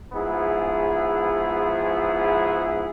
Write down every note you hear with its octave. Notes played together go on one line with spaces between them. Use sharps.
G#2 F3 B3 E4 G#4